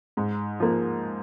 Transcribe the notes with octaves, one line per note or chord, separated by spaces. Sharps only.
G#2
F3 A#3